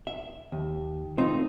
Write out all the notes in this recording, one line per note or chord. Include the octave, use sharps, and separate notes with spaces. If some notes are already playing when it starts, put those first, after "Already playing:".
E5
D#2
A3 C4 D#4 F4